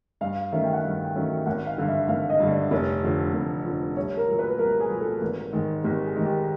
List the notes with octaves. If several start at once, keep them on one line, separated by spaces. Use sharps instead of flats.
G2 F5
D#3 F#3 A3 C#4 E5
G5
F#5
G2 F5
G5
D#3 F#3 A3 C#4
G#1 F#5
F5
G2 D3
E5
G#1 F5
D#5
G2 D3
D5
F1 C#5
F2 D3 F3
F1
F2 D3 F3
C2 C#5
A#4
A#2 F#3
B4
C2 A#4
G#4
A#2 F#3
A4
G#1
G#2 D#3 G#3
G#1 G4
G#4
G#2 D#3 G#3
G4